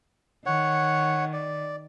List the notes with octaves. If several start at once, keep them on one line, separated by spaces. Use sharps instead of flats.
D#3 C#5 F#5
D5